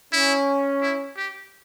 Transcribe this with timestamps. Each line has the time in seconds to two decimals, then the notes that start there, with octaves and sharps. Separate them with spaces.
0.12 C#4 E4
0.82 E4
1.17 G4